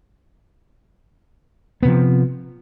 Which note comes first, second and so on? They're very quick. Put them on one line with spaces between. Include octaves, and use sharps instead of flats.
B3 C3 F3